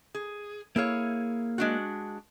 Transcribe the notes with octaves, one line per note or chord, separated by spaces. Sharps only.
G#4
A#3 E4 G#4 C#5 F5
G#3 D4 F#4